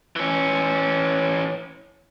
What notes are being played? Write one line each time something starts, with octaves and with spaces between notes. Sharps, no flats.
E3 C#4